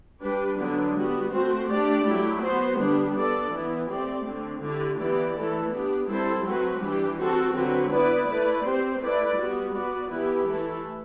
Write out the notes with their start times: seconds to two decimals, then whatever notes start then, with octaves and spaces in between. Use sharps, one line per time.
0.21 G3 D4 G4 B4
0.58 D3 F#3 B3 D4
0.95 G3 B3 F#4
1.32 A3 C4 F#4 C5
1.68 A3 D4 G4 D5
2.05 F#3 A3 E4 G4
2.42 B3 F#4 C5
2.78 D3 G3 B3 D4
3.15 B3 D4 A4 D5
3.52 E3 B3 E4
3.88 A3 C4 G4 D5
4.25 D3 A3 C4
4.61 D3 A3 E4 G4
4.98 E3 B3 E4 G4 D5
5.34 E3 A3 E4 A4
5.71 B3 D4 G4
6.08 G3 C4 E4 A4 C5
6.44 F#3 A3 C4 F#4 B4
6.81 E3 G3 D4 G4
7.18 C4 F#4 A4
7.54 D3 F#3 C4 F#4 B4
7.91 B3 E4 B4 D5
8.28 A3 E4 B4 D5
8.64 C4 G4 C5
9.01 A3 E4 B4 D5
9.38 G3 B3 F#4
9.74 B3 F#4 B4 D5
10.11 E3 B3 E4 G4 B4
10.47 E3 A3 E4 A4